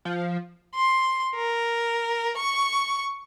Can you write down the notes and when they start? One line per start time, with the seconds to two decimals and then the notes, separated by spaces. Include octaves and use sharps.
0.05 F3
0.75 C6
1.35 A#4
2.37 C#6